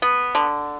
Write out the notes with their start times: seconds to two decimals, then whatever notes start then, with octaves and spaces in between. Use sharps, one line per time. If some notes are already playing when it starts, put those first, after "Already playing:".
0.02 B3
0.35 D3